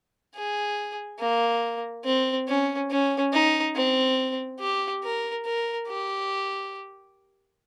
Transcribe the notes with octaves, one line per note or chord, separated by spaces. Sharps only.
G#4
A#3
C4
C#4
C#4
D#4
C4
G4
A#4
A#4
G4